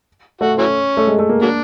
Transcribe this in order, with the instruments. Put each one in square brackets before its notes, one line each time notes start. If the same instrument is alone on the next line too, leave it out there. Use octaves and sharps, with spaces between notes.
[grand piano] A3 [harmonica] F#4
[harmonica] E3 F#3 C#4
[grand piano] A3
G#3
A3
A#3
[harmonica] F#3 D4 [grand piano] A#3